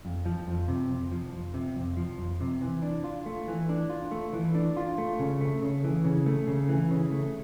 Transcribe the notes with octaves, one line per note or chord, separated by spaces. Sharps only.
F2
F3
F2
C3
F2
F3
F2
C3
F2
F3
F2
C3
E3
D4
F4
A3
E3
D4
F4
A3
E3
D4
F4
A3
C#3
A3
C#3
E3
C#3
A3
C#3
E3
C#3
A3